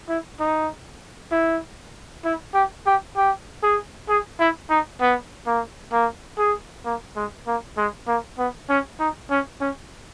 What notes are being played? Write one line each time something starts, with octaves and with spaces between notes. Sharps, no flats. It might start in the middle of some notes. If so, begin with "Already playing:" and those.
E4
D#4
E4
E4
G4
G4
G4
G#4
G#4
E4
D#4
B3
A#3
A#3
G#4
A#3
G#3
A#3
G#3
A#3
B3
C#4
D#4
C#4
C#4